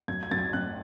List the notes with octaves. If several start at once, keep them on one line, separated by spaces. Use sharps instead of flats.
F#2 G#6
G#6
F#2 A6
G#6
F#2 F#6